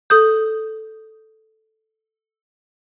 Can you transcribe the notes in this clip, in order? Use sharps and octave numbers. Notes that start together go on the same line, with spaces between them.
A4 D#6 G6